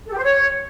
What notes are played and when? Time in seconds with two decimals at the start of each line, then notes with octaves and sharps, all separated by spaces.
0.06 A4
0.12 G4
0.17 C5
0.23 C#5